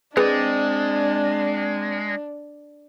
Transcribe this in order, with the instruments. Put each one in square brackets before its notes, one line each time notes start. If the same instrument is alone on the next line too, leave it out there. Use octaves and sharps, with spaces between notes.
[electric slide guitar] G#3 [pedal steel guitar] C4 D5 [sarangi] D4 [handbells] G#4 B4